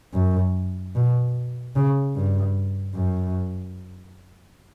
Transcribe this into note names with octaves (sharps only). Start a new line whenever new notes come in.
F#2
B2
C#3
G2
F#2